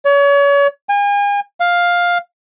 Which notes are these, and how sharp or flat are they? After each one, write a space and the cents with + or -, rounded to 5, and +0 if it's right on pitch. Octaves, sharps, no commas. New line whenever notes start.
C#5 +35
G#5 -40
F5 +10